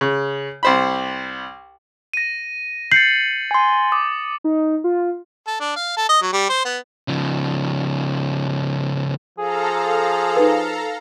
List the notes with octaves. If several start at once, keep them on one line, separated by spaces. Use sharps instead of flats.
C#3
C2 C5 B5
A#6 D#7
G6 A6 C7 C#7 F#7
G#5 C6
D6 D#6
D#4
F4
A4
D4
F5
A4
D#5
F#3
G3
C5
B3
C#3 F3
F3 G#4 A4 F5 A#5
D#4 B4